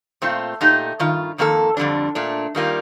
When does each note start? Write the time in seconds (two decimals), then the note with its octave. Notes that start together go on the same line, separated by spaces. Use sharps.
0.22 A#2 A3 C4 F4 A4
0.61 A#2 A3 D#4 G4
0.99 G2 D#3 F4
1.38 F2 D#3 A#3 F4 A4
1.77 F2 D3 G3 D4
2.15 A#2 A3 D4
2.55 D#3 G3 A#3 F4